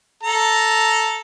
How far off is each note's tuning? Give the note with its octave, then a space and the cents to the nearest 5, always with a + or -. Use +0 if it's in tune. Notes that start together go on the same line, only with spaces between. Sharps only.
A4 +0 A#5 +0